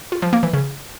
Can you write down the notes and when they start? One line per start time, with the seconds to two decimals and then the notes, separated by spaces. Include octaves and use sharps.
0.12 F4
0.22 F3
0.33 A#3
0.43 E3
0.53 C#3